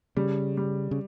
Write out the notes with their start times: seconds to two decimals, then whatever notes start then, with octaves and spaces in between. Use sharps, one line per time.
0.17 C#3 G3
0.57 G3
0.91 C#3